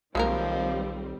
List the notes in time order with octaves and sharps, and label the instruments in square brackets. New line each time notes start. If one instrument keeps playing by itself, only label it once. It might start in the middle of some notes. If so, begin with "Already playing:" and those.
[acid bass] B1 [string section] D#3 G3 C4 [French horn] F3 [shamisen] G#3 A#3 A#4